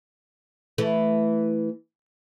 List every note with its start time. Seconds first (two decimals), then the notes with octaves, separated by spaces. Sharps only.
0.78 E3 A3